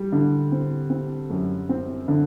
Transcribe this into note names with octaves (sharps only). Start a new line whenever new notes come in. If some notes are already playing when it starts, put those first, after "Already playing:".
Already playing: G3
D3
C4
C4
F#2
C4
D3